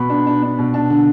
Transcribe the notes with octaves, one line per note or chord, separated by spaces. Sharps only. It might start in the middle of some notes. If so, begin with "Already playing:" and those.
Already playing: B2 B3 B5
D4
D4
D4
B2
D4 A5
D3